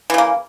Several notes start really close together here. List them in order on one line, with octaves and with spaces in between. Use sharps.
E3 C#3 A#3